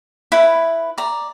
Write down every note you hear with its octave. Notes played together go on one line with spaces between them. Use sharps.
E4 B4
D5 A#5